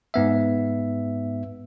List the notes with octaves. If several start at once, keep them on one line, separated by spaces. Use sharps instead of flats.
G#2 B3 E5